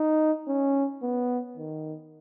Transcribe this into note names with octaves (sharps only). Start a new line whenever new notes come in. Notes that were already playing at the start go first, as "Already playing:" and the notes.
Already playing: D#4
C#4
B3
D#3